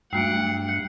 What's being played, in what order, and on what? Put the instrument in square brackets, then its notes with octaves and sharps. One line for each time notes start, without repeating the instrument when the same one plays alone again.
[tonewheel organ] G2 [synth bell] F#3 A3 G5 [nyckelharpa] F#5 [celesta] C7 D7